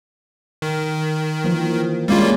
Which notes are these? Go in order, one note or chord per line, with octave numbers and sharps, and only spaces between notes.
D#3
E3 F3 A#3
G3 G#3 A#3 C#4 F4